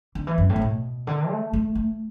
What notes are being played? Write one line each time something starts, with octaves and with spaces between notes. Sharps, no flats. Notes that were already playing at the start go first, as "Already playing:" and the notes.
D3
E3
F#2
A2
D3
B2
D3
A3
A3
A3